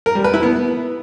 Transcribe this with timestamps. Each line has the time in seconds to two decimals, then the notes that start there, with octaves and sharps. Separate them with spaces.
0.06 A#4
0.15 G3
0.24 B4
0.34 E4
0.43 B3